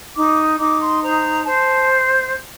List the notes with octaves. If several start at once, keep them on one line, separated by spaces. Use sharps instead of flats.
D#4 D6
D#4 D6
C6
C5 A#5
C5 A5